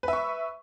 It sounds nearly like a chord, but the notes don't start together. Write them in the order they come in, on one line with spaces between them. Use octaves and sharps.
B4 E5 C#6